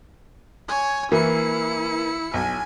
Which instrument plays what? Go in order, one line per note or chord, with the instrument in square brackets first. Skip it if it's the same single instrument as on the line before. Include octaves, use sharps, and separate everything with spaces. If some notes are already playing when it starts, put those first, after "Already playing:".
[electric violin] C#5 G#5
[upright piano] E3 A#3 [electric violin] E4 C#7
[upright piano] B1 [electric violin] G#5